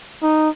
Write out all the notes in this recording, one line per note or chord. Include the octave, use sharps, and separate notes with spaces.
D#4